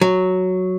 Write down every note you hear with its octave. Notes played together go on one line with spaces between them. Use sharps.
F#3